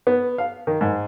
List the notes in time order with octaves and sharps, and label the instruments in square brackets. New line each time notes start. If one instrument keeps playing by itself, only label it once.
[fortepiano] B3
F5
D#3
G#2